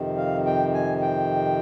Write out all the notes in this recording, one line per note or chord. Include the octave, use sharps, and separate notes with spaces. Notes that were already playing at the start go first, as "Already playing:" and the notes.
Already playing: F2 C3 D#3
F5
G5
G#5
G5